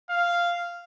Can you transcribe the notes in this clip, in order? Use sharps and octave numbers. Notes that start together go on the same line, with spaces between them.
F5